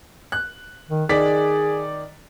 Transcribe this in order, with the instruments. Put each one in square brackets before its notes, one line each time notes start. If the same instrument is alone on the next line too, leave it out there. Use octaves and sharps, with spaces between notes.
[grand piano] F#6
[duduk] D#3
[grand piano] D#3 D5 B6 [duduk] G#4